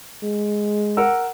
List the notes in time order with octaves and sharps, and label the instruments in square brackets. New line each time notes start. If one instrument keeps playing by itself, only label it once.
[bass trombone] G#3
[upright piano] A#4 F#5 E6